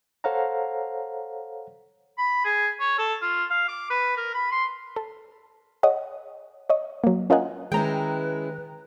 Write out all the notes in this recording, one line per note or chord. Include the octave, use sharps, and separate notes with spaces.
A4 C5 C#5 F5 F#5 A#5
B5
G#4
C#5
A4
F4
F5
D6
B4
A#4
B5
C6
A4
G#4 C#5 D#5 F#5
C#5 D#5
F#3 A#3
C#4 F4 A#4 D#5 F#5 G#5
D#3 G#3 C#4 E4 B4 G5 A#5